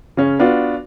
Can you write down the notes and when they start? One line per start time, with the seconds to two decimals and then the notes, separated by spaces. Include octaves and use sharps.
0.17 C#3 C#4
0.39 B3 D4 F4 F#4